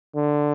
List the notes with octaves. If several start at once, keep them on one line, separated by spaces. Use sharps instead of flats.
D3